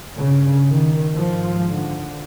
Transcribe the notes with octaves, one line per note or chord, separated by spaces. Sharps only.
G2 C#3
D#3
G#2 F3
D3